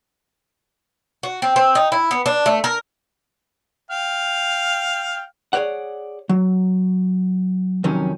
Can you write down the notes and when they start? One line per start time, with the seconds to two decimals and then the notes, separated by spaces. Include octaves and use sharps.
1.23 F#4
1.42 C4
1.56 C4
1.75 D#4
1.92 E4
2.11 B3
2.26 D4
2.46 A3
2.64 A#4
3.91 F5 G5 F6
5.53 G#4 A#4 C#5 D5 F#5
6.29 F#3
7.84 F2 C3 D#3 F#3 C#4